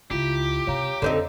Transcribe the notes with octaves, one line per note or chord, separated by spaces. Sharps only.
C#2 E4 F4 G4 B6
C3 C4 C#5 F5 A#5
F2 D3 C4 D#4